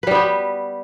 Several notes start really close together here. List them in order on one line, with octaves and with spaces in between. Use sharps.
B4 G3 B3 G4